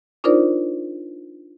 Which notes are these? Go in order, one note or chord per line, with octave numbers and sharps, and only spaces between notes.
D4 D#4 F4 A#4 C5 D5